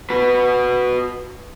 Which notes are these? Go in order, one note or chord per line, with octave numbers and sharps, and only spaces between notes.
F#4 B4